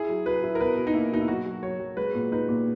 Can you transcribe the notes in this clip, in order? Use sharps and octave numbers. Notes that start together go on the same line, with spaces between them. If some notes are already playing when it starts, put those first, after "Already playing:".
Already playing: E4 G#4
F#3
F#3 B4
E4
A#4
B2 B4
B2
D#4
A#3 E4
B2 D#4
E4
F#3 F#4
F#3
F#3 C#5
F#3
G#3 B4
A#2
D#4 B4
A#2